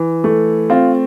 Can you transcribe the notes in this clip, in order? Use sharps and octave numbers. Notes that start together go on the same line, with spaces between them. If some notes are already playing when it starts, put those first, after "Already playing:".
Already playing: E3
A3
C4 F4